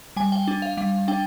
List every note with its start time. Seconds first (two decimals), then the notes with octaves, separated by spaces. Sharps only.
0.16 G3 G#5
0.32 G5
0.48 D4
0.62 F5
0.77 G3 F5
1.08 D4 G5